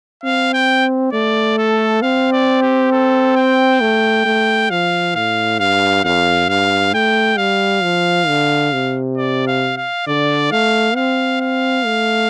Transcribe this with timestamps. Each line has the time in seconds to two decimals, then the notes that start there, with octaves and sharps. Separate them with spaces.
0.23 C4 F5
0.53 G5
1.12 A3 D5
1.58 A4
2.02 C4 F5
2.32 D5
2.62 G4
2.92 A4
3.36 G5
3.81 A3
4.26 A3
4.70 F3 F5
5.15 A2 F5
5.60 G2 F5
6.04 F2 F5
6.49 G2 F5
6.94 A3 G5
7.38 G3 F5
7.83 F3
8.28 D3
8.73 C3
9.17 D5
9.47 F5
9.77 F5
10.07 D3 D5
10.51 A3 F5
10.96 C4 F5
11.41 F5
11.86 A3